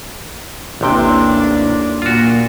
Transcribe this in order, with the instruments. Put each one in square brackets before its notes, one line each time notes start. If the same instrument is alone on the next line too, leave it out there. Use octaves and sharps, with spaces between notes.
[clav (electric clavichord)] A1 C3 G5 [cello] D#2 D4
[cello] A#2 [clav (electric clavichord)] F4 F#4